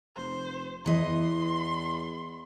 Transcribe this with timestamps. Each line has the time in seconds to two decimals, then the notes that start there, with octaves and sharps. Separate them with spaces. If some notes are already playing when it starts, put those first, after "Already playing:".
0.17 F1 C5
0.86 E2 E3 D#5 C6